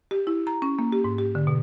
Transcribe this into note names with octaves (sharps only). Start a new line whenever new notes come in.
G4
E4
A#5
C#4
A#3
G4
G#2
G4
D3
B2